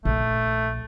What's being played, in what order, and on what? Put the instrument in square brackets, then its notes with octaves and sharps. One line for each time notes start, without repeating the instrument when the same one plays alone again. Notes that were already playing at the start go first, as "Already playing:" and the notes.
[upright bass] A#1 [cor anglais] A3